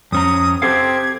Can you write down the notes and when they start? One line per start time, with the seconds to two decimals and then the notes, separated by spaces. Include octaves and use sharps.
0.12 F2 C#4 A#5 D#6
0.62 C4 G4 A4 F5 G#6